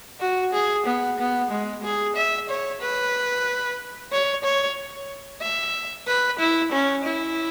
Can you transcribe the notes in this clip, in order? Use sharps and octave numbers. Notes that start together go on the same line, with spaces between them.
F#4
G#4
B3
B3
G#3
G#4
E5
C#5
B4
C#5
C#5
E5
B4
E4
C#4
E4